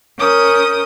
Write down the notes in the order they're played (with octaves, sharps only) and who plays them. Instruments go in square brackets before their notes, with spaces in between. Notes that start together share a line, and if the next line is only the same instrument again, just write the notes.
[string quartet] C#4 A#4 D#6 G6